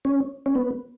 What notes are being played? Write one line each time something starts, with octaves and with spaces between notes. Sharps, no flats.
C#4
C#4
B3